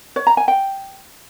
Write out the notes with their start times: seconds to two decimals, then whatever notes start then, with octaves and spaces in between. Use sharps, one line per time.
0.16 C#5
0.27 A#5
0.37 G#5
0.48 G5